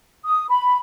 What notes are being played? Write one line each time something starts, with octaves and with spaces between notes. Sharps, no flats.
D#6
B5